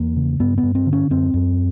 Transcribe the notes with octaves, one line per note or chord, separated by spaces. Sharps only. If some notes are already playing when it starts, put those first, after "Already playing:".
Already playing: E2 A#3
C#3
G2 B3
B3
G2
C4
D3
C#4
F#2 C4
F#2